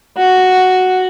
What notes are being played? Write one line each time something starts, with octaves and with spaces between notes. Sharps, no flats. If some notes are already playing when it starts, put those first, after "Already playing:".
F#4